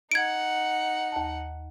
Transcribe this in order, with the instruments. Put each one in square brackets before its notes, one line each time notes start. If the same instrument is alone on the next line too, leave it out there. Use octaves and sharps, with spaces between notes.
[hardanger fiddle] D#4 F#5 [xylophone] G#6 D7
[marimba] D#2 A5